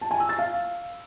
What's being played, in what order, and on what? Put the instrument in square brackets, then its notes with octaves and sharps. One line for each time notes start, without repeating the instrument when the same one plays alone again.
[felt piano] A5
G#5
E6
A6
F5